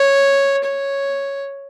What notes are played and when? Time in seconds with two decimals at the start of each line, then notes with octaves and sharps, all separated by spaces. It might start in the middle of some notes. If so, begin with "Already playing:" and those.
Already playing: C#5
0.64 C#5